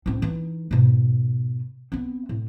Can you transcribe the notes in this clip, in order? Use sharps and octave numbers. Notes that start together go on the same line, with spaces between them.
A2 C4
E3 D#4
G#2 B2
B3 C4
A2